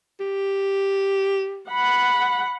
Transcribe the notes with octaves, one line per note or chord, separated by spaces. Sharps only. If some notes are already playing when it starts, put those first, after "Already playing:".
G4
F#5 B5